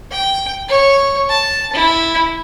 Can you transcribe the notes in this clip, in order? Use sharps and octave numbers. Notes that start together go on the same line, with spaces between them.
G5
C#5
A5
E4